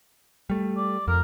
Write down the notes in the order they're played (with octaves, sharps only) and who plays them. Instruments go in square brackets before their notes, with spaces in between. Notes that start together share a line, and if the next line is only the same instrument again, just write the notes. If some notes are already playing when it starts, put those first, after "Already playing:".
[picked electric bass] G3 A3
[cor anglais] D5
[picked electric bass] F2 [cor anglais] A#4